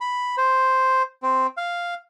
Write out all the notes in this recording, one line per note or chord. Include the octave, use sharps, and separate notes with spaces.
B5
C5
C4
F5